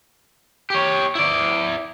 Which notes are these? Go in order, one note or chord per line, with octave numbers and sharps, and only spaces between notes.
G4 C#5
E4 D5